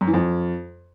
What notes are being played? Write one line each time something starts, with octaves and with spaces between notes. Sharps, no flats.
F#2
E3
F2